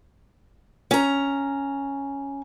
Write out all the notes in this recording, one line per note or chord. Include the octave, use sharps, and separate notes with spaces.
C#4 A#5